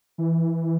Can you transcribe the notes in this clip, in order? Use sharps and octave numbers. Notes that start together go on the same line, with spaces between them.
E3